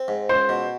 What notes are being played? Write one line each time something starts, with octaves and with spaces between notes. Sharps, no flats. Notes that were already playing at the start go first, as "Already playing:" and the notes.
Already playing: C4
G#2
C#2 C5
B2